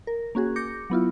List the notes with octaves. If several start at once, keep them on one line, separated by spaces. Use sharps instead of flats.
A#4
A#3 C#4 F#4 G#4
D6 G6 A#6 C#7
F#3 B3 E4 F4